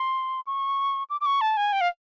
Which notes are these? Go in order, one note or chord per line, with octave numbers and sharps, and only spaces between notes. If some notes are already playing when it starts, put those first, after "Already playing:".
Already playing: C6
C#6
D6
D6
C#6
A5
G#5
G5
F5